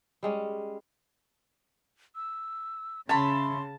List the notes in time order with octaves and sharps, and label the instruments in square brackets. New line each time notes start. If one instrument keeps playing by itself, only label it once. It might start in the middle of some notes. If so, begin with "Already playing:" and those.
[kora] G3 G#3 C#4
[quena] E6
[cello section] C#3 [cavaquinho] C#5 E5 B5 [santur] A5 [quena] C6